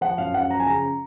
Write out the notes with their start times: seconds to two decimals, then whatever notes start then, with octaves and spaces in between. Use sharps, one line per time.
0.01 F3 F#5
0.18 F#2 F5
0.34 F#2 F#5
0.50 F3 A#5
0.60 G#5
0.66 C#3 A#5